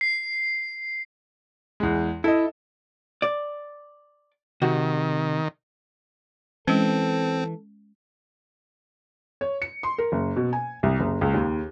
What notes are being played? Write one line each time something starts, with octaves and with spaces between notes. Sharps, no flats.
C7
E2 G#3
E4 A4 D#5
D5
C3 D#3 F#4
E3 G#3 C4 C#4 A4
C#5
C#7
C6
A#4
F#1
B2
G#5
C2
F#1
C#2
D#2